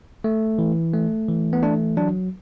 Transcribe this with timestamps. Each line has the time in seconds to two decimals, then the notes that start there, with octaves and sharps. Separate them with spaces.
0.24 A3
0.59 E3
0.94 A3
1.28 E3
1.53 B3
1.63 A3 D4
1.97 F#3 D4